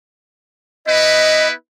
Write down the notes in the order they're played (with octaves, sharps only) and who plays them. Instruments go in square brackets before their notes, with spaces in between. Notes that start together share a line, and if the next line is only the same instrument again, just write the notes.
[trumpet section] B3 E4 B4 [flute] D#5